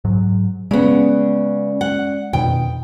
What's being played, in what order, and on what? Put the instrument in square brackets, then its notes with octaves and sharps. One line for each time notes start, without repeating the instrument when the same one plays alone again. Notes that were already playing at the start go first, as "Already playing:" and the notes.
[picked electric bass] G#2 F#3
[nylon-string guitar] C#3 B3 [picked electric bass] G#3 [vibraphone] C#4 D5
[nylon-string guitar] F#5
[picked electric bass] F2 B2 D#3 [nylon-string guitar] G5